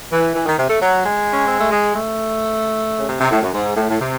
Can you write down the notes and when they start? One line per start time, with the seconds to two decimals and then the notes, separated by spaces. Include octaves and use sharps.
0.12 E3
0.34 E3
0.46 D#3
0.58 C3
0.69 A3
0.80 F#3
1.03 G#3
1.32 C#4
1.45 C4
1.58 A3
1.71 G#3
1.94 A3
2.97 C#3
3.07 C3
3.20 C3
3.31 A2
3.42 F#2
3.53 G#2
3.76 A2
3.89 A2
4.00 C3